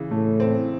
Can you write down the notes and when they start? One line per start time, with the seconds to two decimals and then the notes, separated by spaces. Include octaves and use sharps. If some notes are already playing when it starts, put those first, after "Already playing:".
Already playing: C#3 E3
0.11 A2 A3
0.40 C4